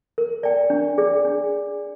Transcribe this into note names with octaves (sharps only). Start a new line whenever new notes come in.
A#4
D5 G5
D4
G#4 D5
D4